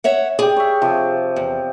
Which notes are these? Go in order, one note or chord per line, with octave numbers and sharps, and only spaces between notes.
C#5 E5 F#5
G4 G#4 D5
C#5 E5
C3 F3
E2